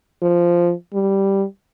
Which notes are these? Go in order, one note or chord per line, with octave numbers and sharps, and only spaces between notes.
F3
G3